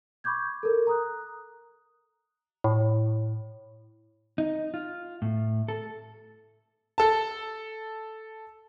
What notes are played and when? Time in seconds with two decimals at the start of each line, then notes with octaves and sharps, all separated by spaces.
0.24 B5 C#6 D6 G6 G#6
0.63 A4 A#4
0.87 A#5 D#6 F#6
2.64 A2
4.38 D#4
4.74 F4
5.22 A2
5.68 A4
6.98 A4 A5